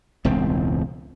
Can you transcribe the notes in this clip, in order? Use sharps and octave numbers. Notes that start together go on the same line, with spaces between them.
E1 C#2 A2 C4